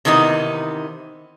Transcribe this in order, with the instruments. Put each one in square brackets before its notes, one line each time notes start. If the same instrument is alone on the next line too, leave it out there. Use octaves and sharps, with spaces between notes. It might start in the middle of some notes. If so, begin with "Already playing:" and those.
[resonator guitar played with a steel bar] C3 D#3 E3 B3 D#4